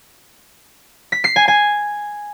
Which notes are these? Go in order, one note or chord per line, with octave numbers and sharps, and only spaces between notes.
B6
C7
G#5
G#5